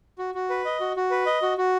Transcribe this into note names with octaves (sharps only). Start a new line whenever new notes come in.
F#4
F#4
B4
D#5
F#4
F#4
B4
D#5
F#4
F#4